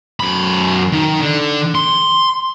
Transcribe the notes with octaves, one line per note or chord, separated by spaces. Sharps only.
F#2 B5
D#3
D3
C6